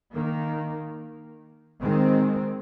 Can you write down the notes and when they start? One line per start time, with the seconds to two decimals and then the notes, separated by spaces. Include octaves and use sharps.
0.15 D#3 A#3
1.81 D#3 G#3 C4